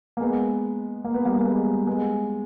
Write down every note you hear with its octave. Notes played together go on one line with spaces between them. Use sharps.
A#3
G#3 B3
A#3
B3
G3 A#3
A#3
G#3 B3
G#3 B3